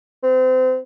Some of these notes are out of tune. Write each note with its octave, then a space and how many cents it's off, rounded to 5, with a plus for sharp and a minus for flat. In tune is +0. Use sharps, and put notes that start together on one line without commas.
C4 -30